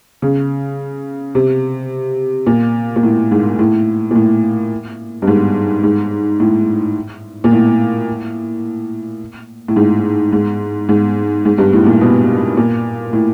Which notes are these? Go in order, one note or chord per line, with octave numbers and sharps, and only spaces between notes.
C#3
C3
A#2
A#2
A2
G#2
A2
A#2
A2
G2
G#2
G#2
A2
A#2
A2
A2
G#2
G#2
G#2
G#2
G2
A2
A#2
B2
A#2
A2